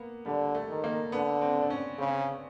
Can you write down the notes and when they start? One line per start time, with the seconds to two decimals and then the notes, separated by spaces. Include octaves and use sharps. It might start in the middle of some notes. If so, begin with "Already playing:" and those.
Already playing: A#3 B3
0.26 D3 G3
0.55 A3
0.69 D#3
0.84 A#3
1.12 D3 B3
1.41 C4
1.61 D4
1.70 C#4
1.99 C#3 C4